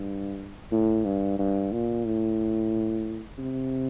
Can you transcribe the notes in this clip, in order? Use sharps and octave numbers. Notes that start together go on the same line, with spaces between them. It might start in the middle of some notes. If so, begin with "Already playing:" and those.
Already playing: G2
A2
G2
G2
A#2
A2
C3